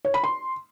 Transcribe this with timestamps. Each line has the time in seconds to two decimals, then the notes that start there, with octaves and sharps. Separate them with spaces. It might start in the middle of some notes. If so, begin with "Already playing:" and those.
0.05 C#5
0.14 B5
0.24 C6